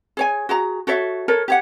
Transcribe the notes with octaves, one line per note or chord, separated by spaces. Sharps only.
G#4 C#5 G#5
F#4 G#4 A#5
F#4 A4 C#5 E5
A4 A#4 C#5
G4 C#5 F#5